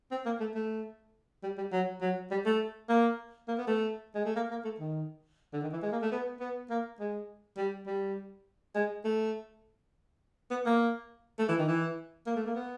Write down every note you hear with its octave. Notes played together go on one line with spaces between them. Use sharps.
C4
A#3
A3
A3
G3
G3
F#3
F#3
G3
A3
A#3
A#3
B3
A3
G#3
A3
A#3
A#3
A3
D#3
D3
D#3
E3
G#3
A#3
A3
B3
B3
A#3
G#3
G3
G3
G#3
A3
B3
A#3
A3
E3
D#3
E3
A#3
A3
A#3
B3